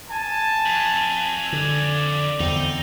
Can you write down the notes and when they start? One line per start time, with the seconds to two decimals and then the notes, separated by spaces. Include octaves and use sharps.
0.11 G#5 A5
0.66 F2
1.52 D3 D5
2.40 E2 D3 C4 D#4